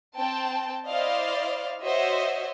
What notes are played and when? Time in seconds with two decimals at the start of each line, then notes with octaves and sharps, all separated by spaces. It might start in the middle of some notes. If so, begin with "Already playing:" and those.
0.17 C4 G5 A5
0.89 E4 C5 D5 D#5 F5
1.83 F#4 C5 C#5 D#5 E5